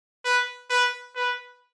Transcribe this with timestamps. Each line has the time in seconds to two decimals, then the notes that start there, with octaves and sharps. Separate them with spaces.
0.25 B4
0.70 B4
1.16 B4